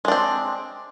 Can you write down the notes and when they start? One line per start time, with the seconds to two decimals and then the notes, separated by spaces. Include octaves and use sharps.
0.05 G#3
0.08 D4
0.12 C4